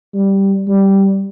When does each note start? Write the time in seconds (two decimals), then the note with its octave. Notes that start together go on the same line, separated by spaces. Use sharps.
0.14 G3
0.68 G3